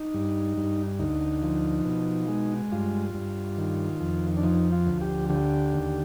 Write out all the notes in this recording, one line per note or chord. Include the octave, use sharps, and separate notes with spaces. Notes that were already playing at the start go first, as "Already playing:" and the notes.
Already playing: D#4
G2
G2
D2 D#4
F3
B2
G#3
G2 F4
G2
D#3
F2
D4
F3 D#4
F4
D2
G4
D3 G4
D#2